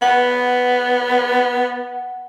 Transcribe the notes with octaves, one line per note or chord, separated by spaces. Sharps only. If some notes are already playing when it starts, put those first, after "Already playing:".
B3 F#5